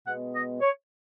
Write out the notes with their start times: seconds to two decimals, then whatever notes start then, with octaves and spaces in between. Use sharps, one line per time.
0.05 B2 G#3 B3 F#5
0.33 D#5
0.61 C#5